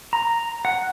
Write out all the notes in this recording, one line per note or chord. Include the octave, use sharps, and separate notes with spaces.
A#5
F#5